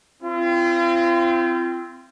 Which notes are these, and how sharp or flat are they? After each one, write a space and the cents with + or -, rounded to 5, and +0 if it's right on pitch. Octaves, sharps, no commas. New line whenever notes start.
C4 -5 F4 -40